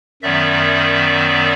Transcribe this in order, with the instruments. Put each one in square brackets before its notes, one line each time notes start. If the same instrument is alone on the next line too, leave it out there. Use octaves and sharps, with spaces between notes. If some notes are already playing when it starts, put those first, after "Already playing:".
[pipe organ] F#2 D#3 F#3 B3 D5 E5